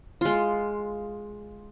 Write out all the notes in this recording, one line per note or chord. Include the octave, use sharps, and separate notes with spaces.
G#3 F4